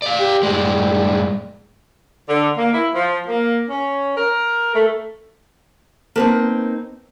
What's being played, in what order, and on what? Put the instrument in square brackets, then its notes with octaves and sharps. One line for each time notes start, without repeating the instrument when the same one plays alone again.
[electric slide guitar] D5 F5
[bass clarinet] G4
[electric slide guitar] F#2 A2 G#3 [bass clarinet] G3
[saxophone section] D3
A#3
E4
F3
A#3
C#4
A#4
A3
[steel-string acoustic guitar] A#3 C4 D#4 [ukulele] A#4 B4 A5